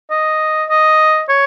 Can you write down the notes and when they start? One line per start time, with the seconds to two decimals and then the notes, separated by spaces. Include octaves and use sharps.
0.11 D#5
0.69 D#5
1.29 C#5